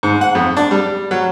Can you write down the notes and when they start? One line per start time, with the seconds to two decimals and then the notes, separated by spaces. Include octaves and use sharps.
0.03 G#2
0.21 F#5
0.35 F2
0.57 D4
0.71 G3
1.11 F#3